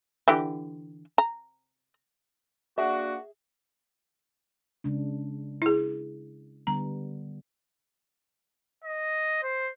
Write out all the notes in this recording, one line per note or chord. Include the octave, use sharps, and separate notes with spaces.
D3 E3 G4
A#5
A#3 D4 F#4 G#4 E5
C#3 G#3 D4
E4 G#4
D3 G3 B3 A#5
D#5
C5